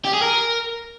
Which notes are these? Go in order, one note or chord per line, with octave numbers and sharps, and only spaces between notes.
G4
G#4
A#4